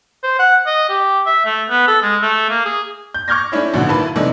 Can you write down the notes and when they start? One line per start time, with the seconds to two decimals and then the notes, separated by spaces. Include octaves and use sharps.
0.23 C5
0.39 F#5
0.66 D#5
0.89 G4
1.26 E5
1.45 A3
1.69 B3
1.87 A4
2.02 G#3
2.22 A3
2.50 A#3
2.65 G#4
3.14 G6
3.28 C#6 D6 F6 G6 G#6 A#6
3.52 A3 C#4 D4 E4 C#5
3.74 A#1 B2 D3 F#4
3.89 D#2 A#3 E4 B4 A5
4.16 G#2 C3 E3 A3 D4 D#4